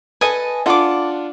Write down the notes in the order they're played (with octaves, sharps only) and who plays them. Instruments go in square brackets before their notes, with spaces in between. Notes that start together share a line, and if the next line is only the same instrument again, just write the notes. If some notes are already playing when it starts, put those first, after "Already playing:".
[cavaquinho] A4 D#5 G#5 [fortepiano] B4 A5
[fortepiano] D4 F4 F#5 [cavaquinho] A4 D6